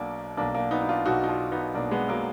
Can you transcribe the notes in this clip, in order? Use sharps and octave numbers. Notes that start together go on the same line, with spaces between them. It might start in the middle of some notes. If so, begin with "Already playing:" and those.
Already playing: B1 B2 A#3 D4
B1 B2 A#3 D4
A#3 D4
B3 D#4
D#4
D4 F4
B1 B2 D#4 F#4
D#4
D4 F4
B3 D#4
B1 B2 A#3 D4
G#3 B3
F#3 A#3